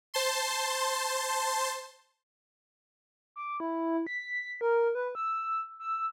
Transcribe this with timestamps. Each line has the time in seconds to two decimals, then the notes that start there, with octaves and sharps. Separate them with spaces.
0.14 C5 A5 C6
3.36 D6
3.60 E4
4.07 B6
4.61 A#4
4.95 B4
5.15 E6
5.79 E6